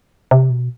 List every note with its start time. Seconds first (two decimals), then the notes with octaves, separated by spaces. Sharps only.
0.31 C3
0.50 B2